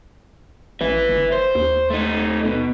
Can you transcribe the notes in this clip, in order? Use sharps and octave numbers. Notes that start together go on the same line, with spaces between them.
A1 B4 E5
G1
C5
D#2
A3 D#4
B2